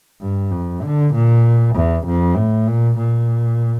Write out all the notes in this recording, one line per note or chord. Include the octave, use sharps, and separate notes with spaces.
G2
F2
D3
A#2
E2
F2
A2
A#2
A#2